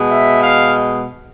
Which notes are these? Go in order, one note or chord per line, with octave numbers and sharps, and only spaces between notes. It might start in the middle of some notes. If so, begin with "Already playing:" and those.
Already playing: B2 G#3
E5
F5